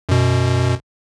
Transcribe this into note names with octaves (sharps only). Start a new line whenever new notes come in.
F#2 B2